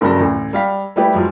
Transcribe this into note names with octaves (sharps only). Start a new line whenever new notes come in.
F#1 G2 C#3 F#3 A4 A#6
A1 D2
G3 F5 B6
G3 A3 E4 G4 B4
G#2 F3 F#3